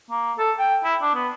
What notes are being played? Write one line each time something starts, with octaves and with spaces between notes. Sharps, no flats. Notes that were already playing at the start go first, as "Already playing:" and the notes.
A#3
A4
G5
E4
D4
B3